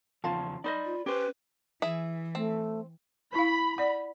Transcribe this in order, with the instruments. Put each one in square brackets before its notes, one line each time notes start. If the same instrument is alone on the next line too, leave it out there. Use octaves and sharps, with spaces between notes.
[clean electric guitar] E2 C#3 F3 [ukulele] F4 F5 A5
[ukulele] D#4 C5 D#5 [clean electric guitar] D5 B5
[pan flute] F4
[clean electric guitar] C#4 [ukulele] G4 C5 [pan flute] B4
[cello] E3 [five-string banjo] E4 G#4 E5
[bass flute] A3 [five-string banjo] C4
[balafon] E4 F5 [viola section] B5
[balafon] D5 F#5